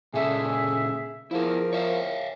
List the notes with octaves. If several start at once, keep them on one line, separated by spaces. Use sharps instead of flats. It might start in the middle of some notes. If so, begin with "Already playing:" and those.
A#2 C#3 G#4 A4 E5
F3 E4 G#4 A#4
C#5 E5 F5